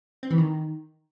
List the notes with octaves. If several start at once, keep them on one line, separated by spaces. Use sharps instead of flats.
C4
E3
D#3